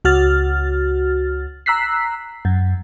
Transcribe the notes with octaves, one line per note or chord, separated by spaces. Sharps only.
C#2 F#4 F6 A6
A#5 E6 F#6 B6 C7
F#2